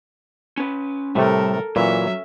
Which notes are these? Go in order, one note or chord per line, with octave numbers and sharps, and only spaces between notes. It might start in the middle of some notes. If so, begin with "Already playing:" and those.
C#4 B4
A2 C3 G3 A3 A4 A#4 E5
A#2 E3 F#3 C#4 E5